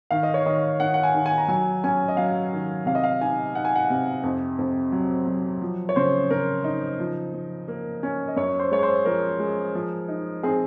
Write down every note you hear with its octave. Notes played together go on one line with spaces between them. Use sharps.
D#3 F5
D#5
C#5
D#3 D#5
D#3 F#5
F#5
G#5
D#3
G#5
A#5
F#3 G#5
C#4 G#5
D#5
F#3 F5
D#3
C3 F5
D#5
F5
D#4 G#5
D#4 F#5
G#5
F#5
C3
F2
F2
F#3
F#3
F3
C#5
C#3 C5
C#3 A#4
D#4
F3
F3
A#3
C#4
D#5
F#2 C#5
C5
G#3 C#5
C5
F3 A#4
G#3
F3
D#4
C4 G#4